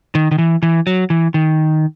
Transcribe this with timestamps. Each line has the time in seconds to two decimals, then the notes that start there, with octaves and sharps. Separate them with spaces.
0.15 D#3
0.31 D#3
0.38 E3
0.63 E3
0.87 F#3
1.10 E3
1.34 D#3